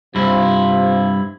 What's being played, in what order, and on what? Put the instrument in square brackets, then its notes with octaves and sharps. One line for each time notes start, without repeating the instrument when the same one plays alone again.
[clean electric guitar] G2 E4 [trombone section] C3 F4